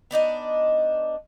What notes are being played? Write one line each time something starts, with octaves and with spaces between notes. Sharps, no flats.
B3 D4 D#4 D#5